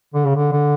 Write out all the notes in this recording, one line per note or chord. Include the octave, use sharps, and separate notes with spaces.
D3
C#3
D3
D3